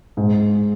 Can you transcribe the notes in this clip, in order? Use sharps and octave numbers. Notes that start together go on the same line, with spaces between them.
G#2